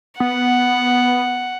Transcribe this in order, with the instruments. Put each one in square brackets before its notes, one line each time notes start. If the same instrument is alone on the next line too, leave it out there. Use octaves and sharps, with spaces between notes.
[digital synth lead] B3 [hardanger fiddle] F#5